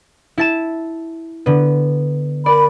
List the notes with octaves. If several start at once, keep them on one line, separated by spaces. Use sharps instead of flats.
E4 A5 E7
D3 B3
A#4 D5 B5